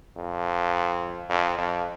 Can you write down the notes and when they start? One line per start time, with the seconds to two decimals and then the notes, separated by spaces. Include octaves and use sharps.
0.17 F2
1.30 F2
1.58 F2